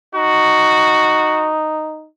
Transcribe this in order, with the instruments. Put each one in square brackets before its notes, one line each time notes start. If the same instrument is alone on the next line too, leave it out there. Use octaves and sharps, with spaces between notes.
[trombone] D#4 [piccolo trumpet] F#4